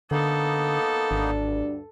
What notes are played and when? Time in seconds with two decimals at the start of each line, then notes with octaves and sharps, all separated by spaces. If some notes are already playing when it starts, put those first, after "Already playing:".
0.11 D3 A#3 B3 D#4 A4
1.11 G#1 D2 G2 D4